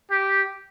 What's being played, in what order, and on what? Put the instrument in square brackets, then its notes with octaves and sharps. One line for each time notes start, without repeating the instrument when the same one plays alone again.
[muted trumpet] G4